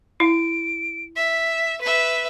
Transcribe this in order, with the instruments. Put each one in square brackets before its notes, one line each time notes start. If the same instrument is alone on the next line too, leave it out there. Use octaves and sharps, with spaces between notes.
[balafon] E4 [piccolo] D7
[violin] E5 [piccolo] B6
[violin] B4 E5 [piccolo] B6